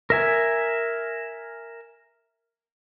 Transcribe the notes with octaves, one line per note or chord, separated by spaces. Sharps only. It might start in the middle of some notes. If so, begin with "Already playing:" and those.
A#4 E5 G#5